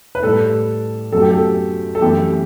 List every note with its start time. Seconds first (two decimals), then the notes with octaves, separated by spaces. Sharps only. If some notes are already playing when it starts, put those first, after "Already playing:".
0.15 B4
0.22 A2 G3 A4
1.12 F#2 F#3 A3 A4
1.22 G4
1.31 A4
1.95 A4
2.01 F#2 E3 A3 G4